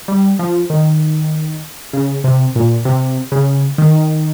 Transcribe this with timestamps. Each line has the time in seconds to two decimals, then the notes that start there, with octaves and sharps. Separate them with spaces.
0.08 G3
0.39 F3
0.70 D#3
1.93 C#3
2.24 C3
2.56 A#2
2.85 C3
3.32 C#3
3.78 D#3